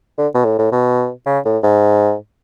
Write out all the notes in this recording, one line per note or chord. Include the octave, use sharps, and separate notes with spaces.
D3
B2
A2
A2
B2
C#3
A2
G#2